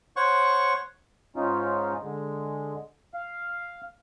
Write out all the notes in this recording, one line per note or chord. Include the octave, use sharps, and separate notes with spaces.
C5 C#5 F#5 C#6
G#2 C#4 D#4 F4
D3 G#3
F5